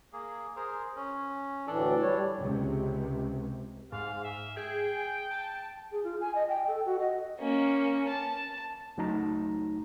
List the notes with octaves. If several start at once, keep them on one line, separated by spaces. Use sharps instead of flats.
A#3 G#4
G#4 A#4 C5
C#4
D2 A2 E3 D4 A4 D5
G3 C#5
C#2 C3
G#2 F5
E5
G#4 G5
A5
G#4
F4
G#5
D#5
G5
A4
F#4
D#5
A#3 C#4
A5
C#2 F#3 A3 D#4 A5 A#5